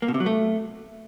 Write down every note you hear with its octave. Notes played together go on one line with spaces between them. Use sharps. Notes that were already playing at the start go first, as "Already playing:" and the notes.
A#3
B2
C3
F#3
A3